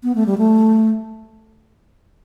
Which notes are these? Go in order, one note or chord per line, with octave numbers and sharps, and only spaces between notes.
B3
A3
G3
A3